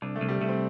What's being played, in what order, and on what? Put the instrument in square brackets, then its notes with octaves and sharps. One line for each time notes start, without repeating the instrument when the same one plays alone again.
[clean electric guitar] C2 [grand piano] D4
[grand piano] A3
[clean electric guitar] C2
[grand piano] G3
[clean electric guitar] C2 [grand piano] A3
[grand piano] C4